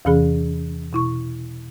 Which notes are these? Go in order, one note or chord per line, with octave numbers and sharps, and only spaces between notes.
E2 C3 E3 C#4 G#4 B5
B2 E4 C#6